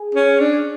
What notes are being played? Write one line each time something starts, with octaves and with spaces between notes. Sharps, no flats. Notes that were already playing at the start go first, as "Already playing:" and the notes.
Already playing: G#4
C#4
D4